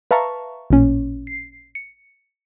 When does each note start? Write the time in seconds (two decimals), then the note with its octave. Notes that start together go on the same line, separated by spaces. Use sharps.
0.11 B4 E5 F5 A5 A#5 C#6
0.70 A1 A#2 C#4
1.27 C7
1.75 C#7